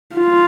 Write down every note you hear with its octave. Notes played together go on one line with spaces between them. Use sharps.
F4